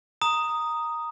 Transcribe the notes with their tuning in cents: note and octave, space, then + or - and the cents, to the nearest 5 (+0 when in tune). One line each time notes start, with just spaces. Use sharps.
A#5 +0 D#6 +0